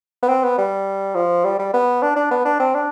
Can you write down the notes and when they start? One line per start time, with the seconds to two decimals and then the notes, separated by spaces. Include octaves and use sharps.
0.23 B3
0.28 C4
0.44 B3
0.58 G3
1.15 F3
1.45 G3
1.59 G3
1.74 B3
2.02 D4
2.16 D4
2.31 B3
2.45 D4
2.60 C4
2.74 D4